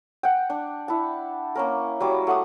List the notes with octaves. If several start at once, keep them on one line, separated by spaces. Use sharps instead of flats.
F#5 G5
D4
E4 A5
A#3 C#4 A#4
F#3 G3 D6
A3 F#5 D6 D#6